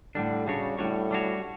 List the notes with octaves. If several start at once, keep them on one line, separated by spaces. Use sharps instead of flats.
A2 D3 G3 D4
C#3 G3 D4 F#4 C#5
A2 G3 D4 F#4 C#5
G3 D4 F#4 C#5